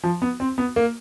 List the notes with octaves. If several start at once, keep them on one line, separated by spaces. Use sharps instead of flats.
F3
B3
C4
B3
A#3